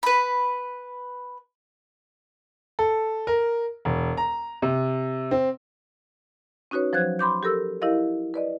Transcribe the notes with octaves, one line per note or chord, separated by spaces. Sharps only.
B4 B5
A4
A#4
E1
A#5
C3
C4
C#4 D#4 F#4 B4 C#5
F3 F#3 C5 F#6 G#6
B5 C6 D6 G6
G4 A4 A#4 E6
E4 G4 A#4 D#5 F5
B4 D5 D#5